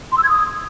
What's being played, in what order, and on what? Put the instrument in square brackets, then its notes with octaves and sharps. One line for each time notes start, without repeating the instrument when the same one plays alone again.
[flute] C6
E6
G#6
D#6